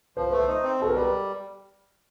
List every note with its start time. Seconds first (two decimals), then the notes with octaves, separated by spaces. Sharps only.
0.16 F3 C5
0.28 A3 B4
0.39 C5
0.48 D#4
0.63 C4
0.79 B2 A4
0.89 A#4
0.94 G3 B4